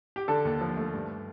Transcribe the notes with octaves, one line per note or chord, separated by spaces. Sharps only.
G4
D3 A4
D#2
F3
A3
G2